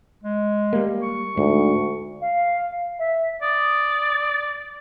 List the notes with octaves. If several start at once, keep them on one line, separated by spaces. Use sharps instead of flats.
G#3
G3 A#3
C#6
D2 G#2
F5
E5
D5 D#6